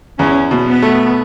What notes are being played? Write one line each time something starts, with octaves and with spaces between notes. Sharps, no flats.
E2 C#4
B2
B3
A3